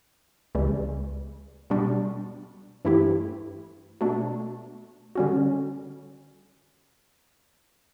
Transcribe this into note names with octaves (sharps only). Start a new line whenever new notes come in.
C#2 C#3 E3 G3
B2 G3 D4 F#4
G2 E3 A3 E4 G4
B2 A3 D4
D3 G3 C#4 F#4